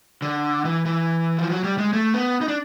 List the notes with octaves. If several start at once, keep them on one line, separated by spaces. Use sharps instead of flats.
D3
E3
E3
F3
F#3
G3
G#3
A3
B3
D#4
D4